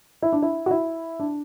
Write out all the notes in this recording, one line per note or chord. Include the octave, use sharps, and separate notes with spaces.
E4
D4
E4
F#4
E4
D4